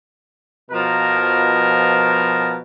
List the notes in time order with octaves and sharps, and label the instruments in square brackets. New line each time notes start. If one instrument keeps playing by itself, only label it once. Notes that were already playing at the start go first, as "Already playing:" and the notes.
[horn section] B2 F3 A#4